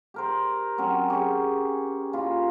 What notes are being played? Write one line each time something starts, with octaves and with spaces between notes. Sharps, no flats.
G4 A#4 C5
F#3 C4 C#4 F#4
G4 G#4 C#5
A#2 F4 B5